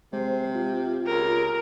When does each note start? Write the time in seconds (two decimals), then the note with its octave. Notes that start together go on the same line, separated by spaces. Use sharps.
0.13 C3 G#3 C5
0.55 F4 G4
1.07 C#2 A#4